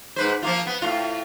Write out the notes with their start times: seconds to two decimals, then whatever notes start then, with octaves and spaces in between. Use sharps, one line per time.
0.16 G#2 B4 C5
0.42 F3 A#3 F4
0.67 B3
0.82 A2 F4